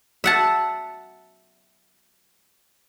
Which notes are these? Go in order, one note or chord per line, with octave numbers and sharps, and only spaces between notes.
E5 F#5 A5